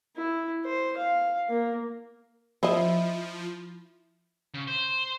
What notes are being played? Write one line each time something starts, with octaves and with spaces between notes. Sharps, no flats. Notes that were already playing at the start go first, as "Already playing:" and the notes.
E4
C5
F5
A#3
F3 E4 C5 D#5
C#3
C5